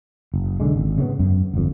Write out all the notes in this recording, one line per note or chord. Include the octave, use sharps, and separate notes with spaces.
F#1
B1 D3 G#3
G#1
C#3 G#3 B3
F#2
G1 F2